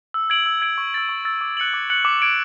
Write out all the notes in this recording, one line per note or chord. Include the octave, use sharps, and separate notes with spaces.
E6
G#6 D7 F#7
E6
G#6 D7 F#7
C#6
E6 A6
C#6
E6 A6
D6
F#6 C#7 F#7
D6
F#6 C#7 F#7
D6
G#6 D7 F#7